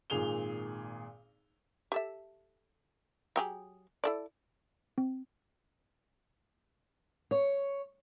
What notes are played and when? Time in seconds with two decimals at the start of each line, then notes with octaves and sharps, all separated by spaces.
0.10 G#1 A#2 G#4 F7 G7
1.92 G4 A4 E5
3.36 F#3 G4 G#4
4.04 E4 A4 D5
4.98 C4
7.31 C#5